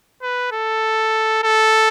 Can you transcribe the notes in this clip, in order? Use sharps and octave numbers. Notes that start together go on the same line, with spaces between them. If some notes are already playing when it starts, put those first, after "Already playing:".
B4
A4
A4